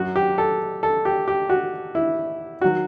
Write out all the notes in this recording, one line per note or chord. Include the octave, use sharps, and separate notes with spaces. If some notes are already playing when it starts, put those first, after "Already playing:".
Already playing: F#2 F#3 F#4
G4
A4
A4
G4
G4
F#4
E4
D#3 F#3 F#4